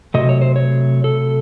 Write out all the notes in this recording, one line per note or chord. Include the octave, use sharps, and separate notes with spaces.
C3 F#3 A3 D#5
C#5
C5
C#5
A4